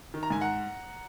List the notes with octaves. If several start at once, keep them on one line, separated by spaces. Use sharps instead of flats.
D#3
A#5
G#2 G#5
F#5 A#5